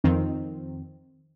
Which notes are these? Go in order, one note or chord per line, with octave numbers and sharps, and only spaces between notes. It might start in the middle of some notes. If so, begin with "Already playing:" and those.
F2 D#3 C4